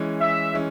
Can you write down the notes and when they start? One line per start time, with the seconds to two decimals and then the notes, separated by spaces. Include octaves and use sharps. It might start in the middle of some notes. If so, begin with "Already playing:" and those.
Already playing: E3 G#3 C#4
0.20 E5
0.54 E3 G#3 C#4